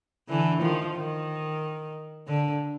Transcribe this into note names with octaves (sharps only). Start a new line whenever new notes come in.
D3 E3
D#3 F3
D#3
D3